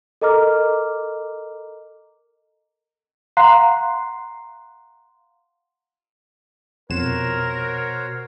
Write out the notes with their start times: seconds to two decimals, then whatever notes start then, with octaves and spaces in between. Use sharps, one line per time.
0.21 A4 A#4 D#5 A#5 D6 F6
3.37 F5 F#5 A#5 C6 F#6 C7
6.90 F2 B2 F#4 A#4 C5 C#5 E7